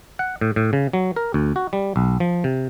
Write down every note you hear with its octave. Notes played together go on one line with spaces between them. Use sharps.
F#5
A2
A2
C#3
F#3
A#4
D2
F#4
G3
B1
F3
C3